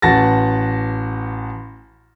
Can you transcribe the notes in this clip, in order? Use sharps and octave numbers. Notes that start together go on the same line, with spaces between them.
A1 F#4 B4 A5 A6 A#6